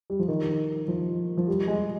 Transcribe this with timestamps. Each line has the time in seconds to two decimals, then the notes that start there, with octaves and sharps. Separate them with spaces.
0.10 G3
0.19 F3
0.28 D#3
0.88 F3
1.37 F3
1.48 G3
1.67 G#3